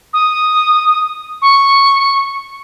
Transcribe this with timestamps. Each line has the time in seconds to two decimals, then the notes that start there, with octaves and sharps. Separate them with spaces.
0.13 D#6
1.42 C#6